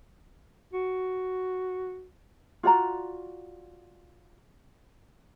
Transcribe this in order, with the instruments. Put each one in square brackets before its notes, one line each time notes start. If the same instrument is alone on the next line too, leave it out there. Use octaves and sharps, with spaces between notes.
[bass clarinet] F#4
[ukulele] F4 F#4 D5 A#5